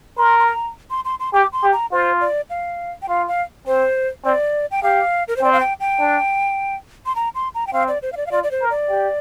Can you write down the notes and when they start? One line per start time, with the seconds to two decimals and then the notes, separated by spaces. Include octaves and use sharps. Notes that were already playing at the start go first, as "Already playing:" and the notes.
0.17 A#4 C6
0.39 C6
0.46 A#5
0.90 C6
1.05 C6
1.20 C6
1.33 G4 D6
1.53 C6
1.63 G4
1.73 A#5
1.91 F4 C5
2.21 D5
2.50 F5
3.02 G5
3.09 F4 F5
3.28 F5
3.67 C4 C5
4.24 C4 D5
4.71 G5
4.83 G4 F5
5.28 A#4
5.36 C5
5.42 C4 D5
5.52 F5
5.60 G5
5.80 G5
6.00 D4
7.06 C6
7.15 A#5
7.35 C6
7.55 A#5
7.67 G5
7.73 C4 F5
7.88 D5
8.02 C5
8.12 F5
8.17 D5
8.26 F5
8.31 F4 D5
8.43 D5
8.51 C5
8.61 A#4
8.70 D5
8.90 G4